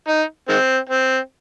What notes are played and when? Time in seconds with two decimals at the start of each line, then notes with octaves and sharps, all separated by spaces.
0.08 D#4
0.49 D#3 G#3 C4
0.90 C4